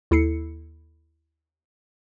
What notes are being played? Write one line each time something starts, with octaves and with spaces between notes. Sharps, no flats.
D#2 E4 A4 C7 C#7